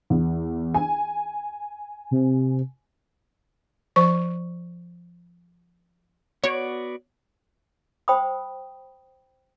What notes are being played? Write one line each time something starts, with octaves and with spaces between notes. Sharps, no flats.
E2
G#5
C3
F3 C5 C#6
B3 F#4 C#5 D5
C5 G5 B5 D#6